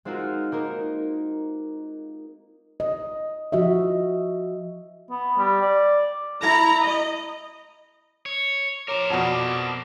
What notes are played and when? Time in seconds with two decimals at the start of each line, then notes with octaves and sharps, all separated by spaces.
0.05 G#3 C4 D#4 F4 F#4 A#4
0.52 A#3 D#4 A#4 C5
2.80 D#5
3.52 F3 F#4 D#5 E5
5.11 B3
5.38 G3
5.61 D5
6.42 E4 A#5 B5
6.84 D#5
8.26 C#5
8.88 A#4 C5 C#5 A#5 D6
9.10 F2 B2 D5 F#5 A5